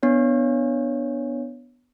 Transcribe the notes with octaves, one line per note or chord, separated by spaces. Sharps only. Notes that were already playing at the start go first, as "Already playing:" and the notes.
B3 D4 C#5